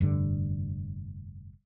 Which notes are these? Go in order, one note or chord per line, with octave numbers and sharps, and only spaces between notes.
F1 G2 D3